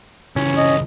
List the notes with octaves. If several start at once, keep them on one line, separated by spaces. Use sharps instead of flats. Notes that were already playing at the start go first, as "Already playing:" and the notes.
C#2 E3 C#4
D#5